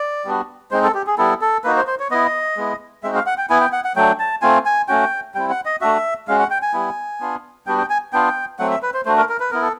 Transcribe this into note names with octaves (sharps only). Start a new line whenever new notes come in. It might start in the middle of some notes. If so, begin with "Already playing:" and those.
Already playing: D5
G3 B3 D4 F#4
G#3 C4 D#4 C5
A4
G4
G#4
G3 B3 E4 A4
A4
A#3 D#4 F#4 B4
C5
C5
C#5
B3 E4 D#5
G#3 B3 E4
G#3 C4 D#4 F#4 E5
F5
F#5
G5
B3 E4 G#5
G5
F#5
F#5
F#3 A3 D4 G5
A5
A3 C4 F4 G#5
G#5
A3 C#4 F#4 G5
G3 C4 E4 G5
F#5
D#5
A3 D4 F#4 E5
G#3 C#4 F#4 F5
F#5
G5
G#5
G3 B3 E4
B3 D4 F4
G3 B3 D4 F#4 G5
G5
G#5
B3 D4 F4 G5
F#3 A3 C4 F#5
E5
B4
C5
A3 D4 F#4 C5
A#4
A#4
B4
B3 E4 A#4
A4